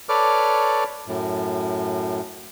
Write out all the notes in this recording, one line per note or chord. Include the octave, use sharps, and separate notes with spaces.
A4 B4 C#5 D5 D6 F6
F#2 A2